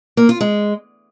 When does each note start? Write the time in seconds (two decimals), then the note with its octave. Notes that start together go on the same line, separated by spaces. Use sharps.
0.17 A#3
0.29 F4
0.41 G#3